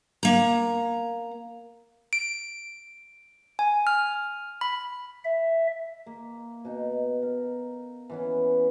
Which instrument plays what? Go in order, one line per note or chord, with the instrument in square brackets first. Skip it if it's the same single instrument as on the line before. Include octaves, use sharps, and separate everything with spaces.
[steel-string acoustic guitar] A#3 A#5
[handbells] D7
G#5
F6
B5
[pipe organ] E5
[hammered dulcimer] A#3
B2 D#4
A#4
E3 B3 C#4